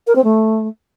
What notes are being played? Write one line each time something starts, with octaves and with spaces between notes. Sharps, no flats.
A#4
C4
A3